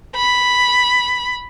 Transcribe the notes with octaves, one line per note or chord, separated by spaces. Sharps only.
B5